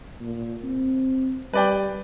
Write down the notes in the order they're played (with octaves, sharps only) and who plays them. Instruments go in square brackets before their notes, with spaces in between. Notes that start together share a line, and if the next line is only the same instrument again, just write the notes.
[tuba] A#2
C4
[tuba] G3 [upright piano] B4 D5 G5